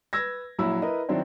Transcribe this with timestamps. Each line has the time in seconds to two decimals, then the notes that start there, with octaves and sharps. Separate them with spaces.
0.13 B4 E6 G#6 A#6
0.59 A#1 F#3 E4 B5 E6
0.82 E4 A#4 B4 D#5
1.09 D#3 F#3 C4 D4 E4 C5